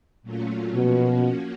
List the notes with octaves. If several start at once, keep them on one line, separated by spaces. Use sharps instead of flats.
A#2 F#3 A3 C#4 F4
B2 F3 A#3 C#4 F#4